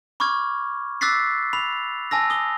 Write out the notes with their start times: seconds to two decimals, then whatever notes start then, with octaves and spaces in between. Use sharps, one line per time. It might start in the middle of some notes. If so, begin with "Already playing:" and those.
0.20 B5 C#6 D6 F6 G#6
1.01 D6 E6 F#6 A6 B6 C7
1.53 B5 F7
2.11 G#5 A5 E6 A#6
2.30 D#6 G7